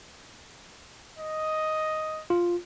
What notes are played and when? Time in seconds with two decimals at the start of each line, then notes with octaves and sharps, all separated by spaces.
1.19 D#5
2.30 F4